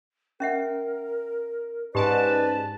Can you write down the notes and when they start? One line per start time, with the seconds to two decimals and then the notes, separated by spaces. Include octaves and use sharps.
0.40 C#4 A#4 E5 F#5
1.95 G#2 C#4 G4 B4 D5 G#5 A5